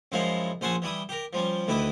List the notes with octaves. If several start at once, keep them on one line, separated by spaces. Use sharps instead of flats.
F#2 F3 G#3 E4 F5 F#5
A#1 C#4 C5 F#5 G#5 A5
E3 G3 E4 D#6
G4 A#4
F3 G3 C#4
D2 D#3 E4 B4 D6 D#6